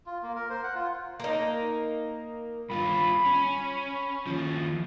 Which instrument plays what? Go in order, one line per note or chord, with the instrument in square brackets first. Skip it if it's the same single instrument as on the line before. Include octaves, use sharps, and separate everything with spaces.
[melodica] F4
A#3
A#4
C5
F#5
F4
[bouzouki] A#3 D#4
[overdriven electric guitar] G2 F4 [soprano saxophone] B5
[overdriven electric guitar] C#4
D#2 F3